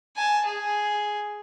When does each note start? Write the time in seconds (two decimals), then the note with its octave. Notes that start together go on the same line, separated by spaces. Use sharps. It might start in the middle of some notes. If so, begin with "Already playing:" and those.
0.16 G#5 A5
0.45 G#4